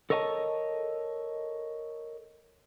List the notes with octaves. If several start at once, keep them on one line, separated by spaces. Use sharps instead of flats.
A4 A#4 C#5 D#5 F5 A5